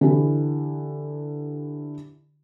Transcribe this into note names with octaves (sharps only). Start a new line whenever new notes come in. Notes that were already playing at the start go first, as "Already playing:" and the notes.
D3 E3 E4 G4